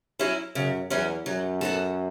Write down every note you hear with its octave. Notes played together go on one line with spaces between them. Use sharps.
F#3 C#4 E4
F#2 C#3
E2 F#3 C#4 E4
F#2 F#3
B3 F#4 A4